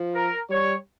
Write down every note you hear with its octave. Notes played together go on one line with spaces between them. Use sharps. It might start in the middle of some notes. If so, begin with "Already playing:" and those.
Already playing: F3
A#4
G3 C#5